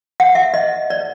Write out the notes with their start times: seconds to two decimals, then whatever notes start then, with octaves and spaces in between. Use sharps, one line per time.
0.20 F#5
0.35 E5
0.54 D#5
0.90 D5